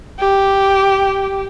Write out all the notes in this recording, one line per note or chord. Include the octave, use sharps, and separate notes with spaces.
G4